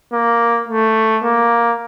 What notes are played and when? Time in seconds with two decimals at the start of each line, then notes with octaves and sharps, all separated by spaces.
0.13 A#3
0.68 A3
1.24 A#3